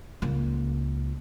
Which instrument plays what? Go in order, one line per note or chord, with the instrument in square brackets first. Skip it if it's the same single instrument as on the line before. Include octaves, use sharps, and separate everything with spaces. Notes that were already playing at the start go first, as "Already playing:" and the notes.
[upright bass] C#2 A#3